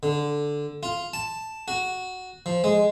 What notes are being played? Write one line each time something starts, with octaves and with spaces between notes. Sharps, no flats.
D3
F4
A5
F#4
F3
G#3